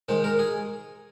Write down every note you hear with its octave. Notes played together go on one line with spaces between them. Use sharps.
D#3 G#3 C5
A#4
G#4